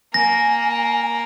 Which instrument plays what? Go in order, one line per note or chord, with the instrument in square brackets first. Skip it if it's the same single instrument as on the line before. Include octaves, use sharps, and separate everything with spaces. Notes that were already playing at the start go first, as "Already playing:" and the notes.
[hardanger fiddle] A#3 [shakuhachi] G#5 [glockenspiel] A#6